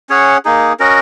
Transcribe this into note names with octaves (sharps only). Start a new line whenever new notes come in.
C#4 G#4 C#5 F#5
A#3 D#4 G#4
C#4 F#4 A#4 D#5